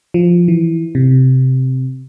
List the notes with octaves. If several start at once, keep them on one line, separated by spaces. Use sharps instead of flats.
F3
E3
C3